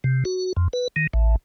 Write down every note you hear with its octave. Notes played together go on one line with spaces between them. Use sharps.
C3
F#4
F2
B4
D#3
A1